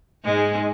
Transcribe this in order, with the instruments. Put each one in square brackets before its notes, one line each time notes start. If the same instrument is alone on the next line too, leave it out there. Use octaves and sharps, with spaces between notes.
[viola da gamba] G#2 G#3